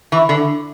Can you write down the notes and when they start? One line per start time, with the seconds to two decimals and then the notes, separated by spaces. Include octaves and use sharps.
0.12 E3
0.29 D3